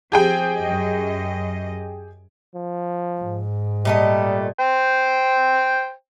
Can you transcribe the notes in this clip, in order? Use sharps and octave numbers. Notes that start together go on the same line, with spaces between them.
F3 C4 G4 G#4 G5
F#2 D#5
F3
G#2
A#2 G3 A3 D#5
C5 G5